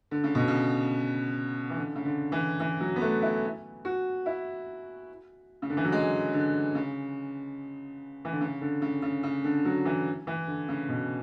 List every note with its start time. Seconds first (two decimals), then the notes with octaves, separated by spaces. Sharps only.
0.11 D3
0.24 C#3
0.35 B2
0.48 C#3
1.70 E3
1.77 D3
1.95 C#3
2.05 D3
2.32 E3
2.60 E3
2.80 F#3
2.96 B3
3.01 A3
3.22 E4
3.85 F#4
4.26 E4
5.62 C#3
5.70 D3
5.77 E3
5.84 F#3
5.92 G#3
6.33 D3
6.75 C#3
8.25 E3
8.32 D3
8.41 C#3
8.61 D3
8.82 C#3
9.02 C#3
9.23 C#3
9.44 D3
9.65 F#3
9.85 E3
10.27 E3
10.48 D3
10.69 C#3
10.89 B2